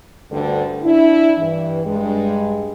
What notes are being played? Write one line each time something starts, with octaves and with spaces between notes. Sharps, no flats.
D2 G2 D3
D4 E4
G2 E3
G2 G#3